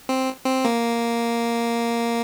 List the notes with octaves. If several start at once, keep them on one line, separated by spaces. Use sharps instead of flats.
C4
C4
A#3